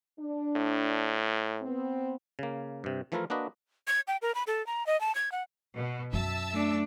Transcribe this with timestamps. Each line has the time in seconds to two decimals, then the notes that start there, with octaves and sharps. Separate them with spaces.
0.19 D4
0.56 A2
1.62 B3 C4
2.39 C#3 A#3
2.84 G2 C3
3.12 E3 F3 A3 E4 F4 A#4
3.30 A#3 D4 F#4 B4 D#5
3.87 G#6
4.08 G5
4.22 A#4
4.35 B5
4.47 A4
4.67 A#5
4.87 D#5
5.01 A5
5.15 G#6
5.32 F#5
5.75 B2
6.13 F#2 F#3 E5 A5 E6
6.52 A3 D4